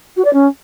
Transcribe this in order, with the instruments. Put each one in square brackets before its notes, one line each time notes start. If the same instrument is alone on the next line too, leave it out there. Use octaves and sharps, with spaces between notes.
[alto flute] F#4
D5
C#4